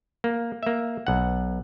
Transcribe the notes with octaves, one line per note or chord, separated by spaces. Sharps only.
A#3
A#3 E5
B1 F#5